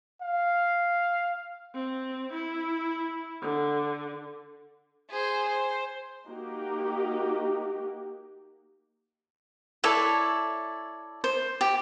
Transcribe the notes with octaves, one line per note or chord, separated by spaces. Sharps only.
F5
C4
E4
D3
G#4 C5
C5
A#3 D#4 F#4 G4
E4 A4 C#5 D5
C5
G4